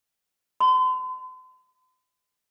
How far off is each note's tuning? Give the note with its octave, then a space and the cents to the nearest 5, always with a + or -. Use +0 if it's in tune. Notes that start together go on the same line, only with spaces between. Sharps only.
C6 -45